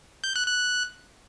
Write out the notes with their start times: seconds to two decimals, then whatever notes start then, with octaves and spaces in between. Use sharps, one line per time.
0.24 G6
0.36 F#6
0.48 F#6